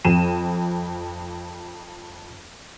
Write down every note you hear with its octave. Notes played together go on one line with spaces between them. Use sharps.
F2 D#7 E7